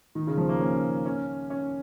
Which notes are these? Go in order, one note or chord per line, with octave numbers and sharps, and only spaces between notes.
D#3
C#3
F3
A#3
C#4
C#4
C#4